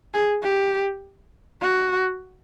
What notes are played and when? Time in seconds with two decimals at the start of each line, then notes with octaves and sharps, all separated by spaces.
0.14 G#4
0.43 G4
1.61 F#4